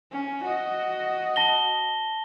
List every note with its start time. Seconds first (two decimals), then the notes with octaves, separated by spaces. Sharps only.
0.12 C#4
0.43 F#4 D#5
1.36 A5 A#6 G7